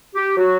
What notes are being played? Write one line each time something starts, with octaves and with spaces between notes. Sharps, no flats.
G4
F#3 F#4